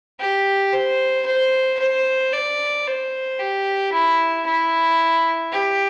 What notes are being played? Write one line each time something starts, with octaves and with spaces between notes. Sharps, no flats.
G4
C5
C5
C5
D5
C5
G4
E4
E4
G4